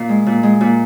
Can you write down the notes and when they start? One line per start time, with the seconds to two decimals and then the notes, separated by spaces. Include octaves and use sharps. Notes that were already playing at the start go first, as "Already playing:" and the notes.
Already playing: A#2 F5
0.09 G#3
0.26 A#2
0.43 G#3
0.61 A#2